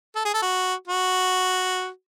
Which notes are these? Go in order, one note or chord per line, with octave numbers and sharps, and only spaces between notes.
A4
G#4
A4
F#4
F#4